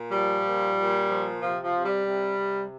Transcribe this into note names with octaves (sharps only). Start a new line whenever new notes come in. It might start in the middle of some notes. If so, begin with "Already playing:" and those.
Already playing: A#2
F3 G3
A#2
A#2
F3
C3 F3
F3
C3
G3
C3
C3